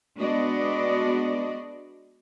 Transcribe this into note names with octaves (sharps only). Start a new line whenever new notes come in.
G#3 B3 D4 F#4 D5 D#5